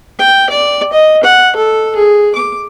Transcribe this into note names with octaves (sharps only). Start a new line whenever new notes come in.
G5
D5
D#5
F#5
A4
G#4
D6